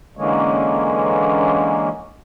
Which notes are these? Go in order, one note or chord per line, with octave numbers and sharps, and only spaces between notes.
D3 E3 G#3 A#3 C#4